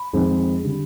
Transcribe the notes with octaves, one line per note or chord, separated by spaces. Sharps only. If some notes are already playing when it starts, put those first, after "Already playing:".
Already playing: B5
F2 D#3 G#3 C4
D3 G3